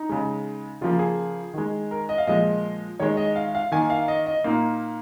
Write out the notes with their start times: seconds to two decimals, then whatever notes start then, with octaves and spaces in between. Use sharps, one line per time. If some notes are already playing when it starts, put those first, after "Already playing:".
Already playing: D#4
0.09 C#3 G#3
0.81 C#3 F3 A#3 F4
0.99 G#4
1.54 D#3 G#3
1.91 A#4
2.09 D#5
2.18 F5
2.27 A#2 F3 G#3 D#5
3.00 D#3 G#3 C#5
3.17 D#5
3.36 F5
3.55 F5
3.72 D#3 A#3 G#5
3.90 F5
4.08 D#5
4.26 D#5
4.44 A#2 A#3 D#4